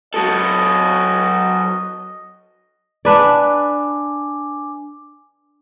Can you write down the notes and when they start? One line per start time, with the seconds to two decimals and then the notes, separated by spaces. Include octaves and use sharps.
0.14 F#3 A4 D#5
3.05 D4 B4 D5 G#5 D6